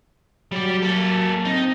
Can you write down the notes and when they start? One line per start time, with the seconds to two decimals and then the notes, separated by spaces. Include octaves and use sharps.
0.52 F#3 G3 D5
0.82 A#3 A4
1.45 C4 D#4